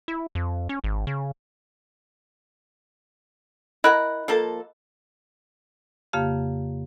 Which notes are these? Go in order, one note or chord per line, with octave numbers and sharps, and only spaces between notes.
E4
F2
C#4
G#1
C#3
E4 A#4 D#5 F#5 B5 F#6
F3 A#3 A4
F2 C#3 A#3 G4 F5